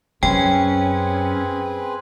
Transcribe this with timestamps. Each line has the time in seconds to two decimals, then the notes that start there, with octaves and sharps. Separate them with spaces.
0.23 F#2 C4 C#4 G#4 B4 G5